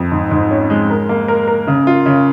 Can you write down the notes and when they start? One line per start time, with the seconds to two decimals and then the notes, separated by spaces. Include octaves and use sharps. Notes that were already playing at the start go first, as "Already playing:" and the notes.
Already playing: F2
0.12 G#2
0.31 G#2
0.51 C#4
0.70 G#3
0.90 A#4
1.09 A#3
1.28 A#4
1.48 A#4
1.67 C#3
1.87 F4
2.06 C#3